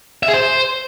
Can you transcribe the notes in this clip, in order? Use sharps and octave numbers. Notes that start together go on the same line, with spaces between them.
E5
G#4
C5